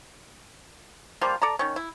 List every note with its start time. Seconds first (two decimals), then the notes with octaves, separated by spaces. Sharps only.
1.21 F3 G3 A#3 F4
1.42 A4 D5 A5 A#5
1.59 D#3 C#4
1.76 E4